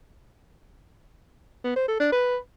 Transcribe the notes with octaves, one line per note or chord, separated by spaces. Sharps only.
B3
C5
A4
D4
B4